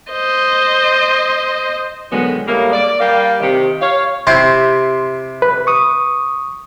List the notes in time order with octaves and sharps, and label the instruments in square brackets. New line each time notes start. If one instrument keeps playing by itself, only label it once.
[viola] C5 D#5
[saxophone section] B2 D3 D#3 F#3 G#3 B3
A2 G3 G#3 A#3
D5
G3 A#3 G4 D5 F5
C3 D#3 G4
C#5 F5
[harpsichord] C3 E4 G4 [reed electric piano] C6
[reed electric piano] B4
C#6 D#6